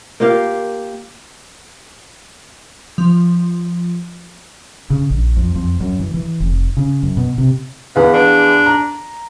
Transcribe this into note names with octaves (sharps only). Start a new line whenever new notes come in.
A#3 F4 G4 F5
F3
C#3
A#1
F2
F2
F#2
E3
E3
F1
C#3
F#2
B2
C3
E2 B3 F5
D4
A#5